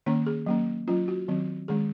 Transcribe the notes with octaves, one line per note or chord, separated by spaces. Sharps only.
D#3 A#3 C#4 C#5
G#4
F#3 A#3 C#4
F#3 C#4 F4
F#4
D#3 F#3 C4
D#3 G#3 C#4 G#4